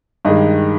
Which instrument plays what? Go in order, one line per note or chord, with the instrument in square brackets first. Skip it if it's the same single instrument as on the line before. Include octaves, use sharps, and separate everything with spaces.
[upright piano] G2 D#3 G#3 D#5